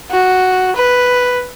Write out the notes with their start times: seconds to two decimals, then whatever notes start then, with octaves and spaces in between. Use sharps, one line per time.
0.11 F#4
0.76 B4